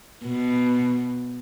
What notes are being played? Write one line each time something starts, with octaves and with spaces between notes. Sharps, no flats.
B2